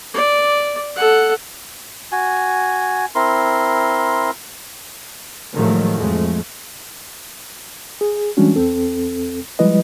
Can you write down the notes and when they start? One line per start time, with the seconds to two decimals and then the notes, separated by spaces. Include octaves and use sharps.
0.14 D5
0.96 A4 F#5
2.12 F#4 G#5
3.15 C4 E4 A#4 C6
5.53 A2 D#3 F3 F#3 G#3 A3
5.97 F2 G#3 A3
8.01 G#4
8.37 E3 G3 G#3 C#4 D4 F#4
8.56 E2 C4 A4
9.59 F3 G3 G#3 E4 B4 D#5